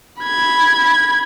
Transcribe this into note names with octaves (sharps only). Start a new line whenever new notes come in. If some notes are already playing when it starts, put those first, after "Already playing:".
B5 G#6